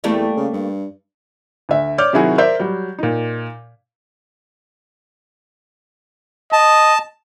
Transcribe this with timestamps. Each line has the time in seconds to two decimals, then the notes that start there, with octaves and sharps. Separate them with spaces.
0.04 E2 G3 A3 A#3
0.36 C#3
0.53 G2
1.69 D2 E5
1.98 C#5 D5 D6 F6 G6
2.13 C3 D#3 F#3 E4 F#4 G#4
2.38 A#4 C5 D5 E5 G6
2.59 F#3 G3
2.98 A#2 D#4
6.53 D#5 A5